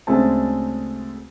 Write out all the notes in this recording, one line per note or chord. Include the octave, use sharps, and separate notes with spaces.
D2 C#3 G#3 A3 C4 A5